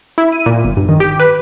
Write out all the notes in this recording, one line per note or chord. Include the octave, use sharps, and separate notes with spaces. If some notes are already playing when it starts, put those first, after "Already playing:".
E4
D#7
A#2
G1
G2
D#3
G4
B4